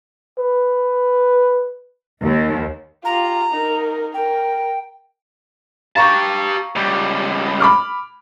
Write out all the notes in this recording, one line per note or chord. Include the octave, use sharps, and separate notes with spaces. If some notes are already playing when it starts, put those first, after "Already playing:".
B4
D#2
F4 G4 A#5
D#4 A#4
A#4 G5
G4 F5 A5 A#5 C#6
C#2 G3
B5 D6 F6